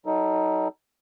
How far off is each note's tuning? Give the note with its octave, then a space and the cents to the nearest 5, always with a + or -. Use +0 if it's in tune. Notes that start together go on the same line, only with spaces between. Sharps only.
F#3 +45 D#4 +25 A4 +30